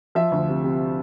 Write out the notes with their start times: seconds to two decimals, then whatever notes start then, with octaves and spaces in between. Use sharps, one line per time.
0.15 F3 E5
0.32 D2
0.48 C3
0.64 C3